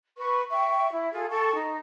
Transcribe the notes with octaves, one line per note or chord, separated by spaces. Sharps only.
B4 C#6
E5 G5 C#6
E4
F4 G#4 A4
A4 G5 A5 C#6
D#4